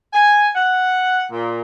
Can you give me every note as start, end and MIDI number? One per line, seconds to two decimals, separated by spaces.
0.13 0.48 80
0.55 1.23 78
1.32 1.60 46